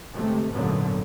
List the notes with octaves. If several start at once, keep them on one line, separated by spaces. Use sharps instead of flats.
G1 C3 G#3 A3
G#1 F#2 A#2 D3 F#3 B3